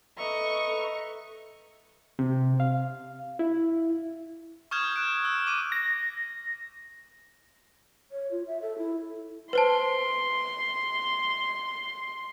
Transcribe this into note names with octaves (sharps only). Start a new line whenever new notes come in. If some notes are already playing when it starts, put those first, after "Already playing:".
A4 B4 D#5 E5 A#5 C#6
C3
F5
E4
C#6 D#6 F6 G6 G#6 E7
F#6 D7
E6
D6 D#7
A#6
C#5
F4
E5
A4
E4
B4 C5 A5 C6